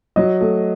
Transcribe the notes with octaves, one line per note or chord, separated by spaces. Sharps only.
F#3 D#5
A3